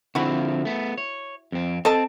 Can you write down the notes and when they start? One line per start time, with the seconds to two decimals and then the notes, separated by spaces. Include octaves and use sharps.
0.15 D3 F3 C4 E4 F#4
0.65 A3 B3
0.98 C#5
1.52 F2 C4
1.85 C4 A4 D#5 A5